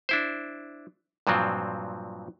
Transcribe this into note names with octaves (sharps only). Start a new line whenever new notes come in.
D4 E4 C5
G2 A#2 F3 F#3 C4